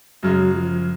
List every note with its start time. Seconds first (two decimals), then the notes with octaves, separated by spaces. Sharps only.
0.23 F#2 C#3 F#3 G#3
0.55 F3